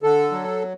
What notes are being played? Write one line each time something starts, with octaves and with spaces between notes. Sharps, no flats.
D3 A4
F#3